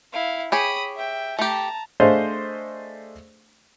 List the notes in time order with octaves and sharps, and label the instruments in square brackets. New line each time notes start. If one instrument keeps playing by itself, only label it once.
[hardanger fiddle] E4 F5
[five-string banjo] G4 G#4 C#5 [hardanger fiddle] B5 D#6
[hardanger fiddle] E5 G5
[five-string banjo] A3 G4 [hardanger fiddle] A5 A#5
[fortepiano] A3 D4 G#4 C5 D#5 F5